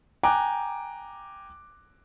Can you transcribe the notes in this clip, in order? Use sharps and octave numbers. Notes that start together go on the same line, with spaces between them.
G5 G#5 A#5 D6 F#6